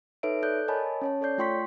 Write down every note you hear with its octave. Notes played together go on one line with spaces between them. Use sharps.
D#4 A4 B4 C#5 E5 D7
A4 D5 F#6 G6
A#4 C#5 D#5 G#5 A5 B5
C#4 C#5 A5
A4 C#5 D5 G6 C7
A3 F4 G5 C6 C#6 B6